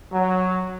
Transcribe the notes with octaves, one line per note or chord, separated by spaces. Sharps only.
F#3